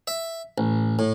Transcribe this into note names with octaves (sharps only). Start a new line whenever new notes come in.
E5
A1
A2